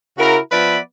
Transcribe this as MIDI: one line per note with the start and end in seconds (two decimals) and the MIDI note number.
0.18 0.38 49
0.18 0.38 64
0.18 0.38 66
0.18 0.38 70
0.51 0.78 53
0.51 0.78 59
0.51 0.78 71
0.51 0.78 74
0.51 0.78 76
0.51 0.78 83